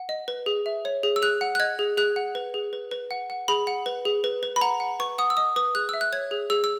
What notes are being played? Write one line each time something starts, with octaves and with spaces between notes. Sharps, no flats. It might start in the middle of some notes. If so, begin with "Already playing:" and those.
Already playing: F#5
D#5
B4
G#4
E5
C#5
G#4
E6
G#4 F#6
F#5
F#6
D#5 G#6
G#4
G#4 F#6
F#5
B4
G#4
B4
B4
F#5
F#5
G#4 B5
F#5
B4
G#4
B4
B4
B5
F#5 A#5
F#5
B4 C#6
F#5 D#6
E6
D#5 D#6
B4 D#6
G#4 F#6
E5 E6
F#6
C#5 G#6
G#4
G#4 E6
E6